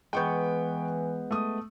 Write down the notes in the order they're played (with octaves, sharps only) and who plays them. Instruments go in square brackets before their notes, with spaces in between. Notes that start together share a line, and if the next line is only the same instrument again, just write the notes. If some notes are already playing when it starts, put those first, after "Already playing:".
[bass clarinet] E3 [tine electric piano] G#3 B3 [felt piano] G5 C#6 G6
[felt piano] A3 D#6